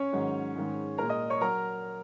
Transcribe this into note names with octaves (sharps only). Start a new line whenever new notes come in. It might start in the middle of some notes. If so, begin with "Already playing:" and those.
Already playing: C#4 C#5
G#2 D#3 F#3
G#2 D#3 G#3
A#2 G#3 A#4 A#5
D#5 D#6
C#5 C#6
F#3 A#4 A#5